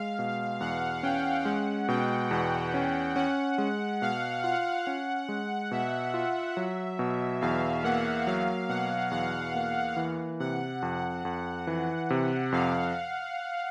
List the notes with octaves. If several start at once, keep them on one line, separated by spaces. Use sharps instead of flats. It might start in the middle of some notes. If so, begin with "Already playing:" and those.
Already playing: G#3 F5
B2
E2 F#5
C#4 G5
G#3 F#5
B2 G5
E2 F#5
C#4
C#4 F#5
G#3
B2 F5
F4 F#5
C#4
G#3
B2 E5
F4
F#3
B2
E2 F5
A#3 F#5
F#3 F5
B2 F#5
E2 F#5
A#3
E3
C3 F#5
F2
F2
E3
C3
F2 F5